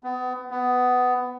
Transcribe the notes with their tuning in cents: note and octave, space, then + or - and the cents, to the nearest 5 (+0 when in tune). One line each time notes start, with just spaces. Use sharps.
B3 +30
B3 +15